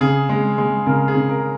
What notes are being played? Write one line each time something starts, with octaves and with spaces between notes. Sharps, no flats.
C#3 G#4
G#3
G#3
C#3 A#4
G#4
C#3
A#4